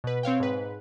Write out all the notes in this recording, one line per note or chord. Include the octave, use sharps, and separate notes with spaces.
B2 B4
C4 C#5 F5 G5
G#2 B4